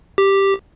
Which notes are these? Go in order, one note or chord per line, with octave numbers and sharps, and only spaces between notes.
G4